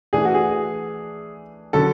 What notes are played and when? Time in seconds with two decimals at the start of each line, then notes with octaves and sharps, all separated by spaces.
0.13 E3 A3 D4 G#4
0.25 F#4
0.34 G#4
1.73 D3 F#3 C#4 A4